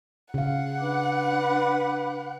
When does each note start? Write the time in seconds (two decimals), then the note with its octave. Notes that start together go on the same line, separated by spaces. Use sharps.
0.34 C#3 F5 F#5
0.79 D4 B4 D6